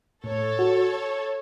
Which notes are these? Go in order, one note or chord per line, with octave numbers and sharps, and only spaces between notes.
A2 A4 C#5
F#4